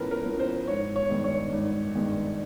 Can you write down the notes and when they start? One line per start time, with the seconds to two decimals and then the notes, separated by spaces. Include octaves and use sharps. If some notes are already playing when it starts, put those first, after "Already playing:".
Already playing: A2 F3 C#4 A#4 B4
0.11 A#4
0.26 F3 A#3 C#4
0.39 C5
0.68 G#1 C#5
0.96 C#5
1.10 G2 D#3 G#3
1.24 C#5
1.53 G#1
1.95 G2 D#3 G#3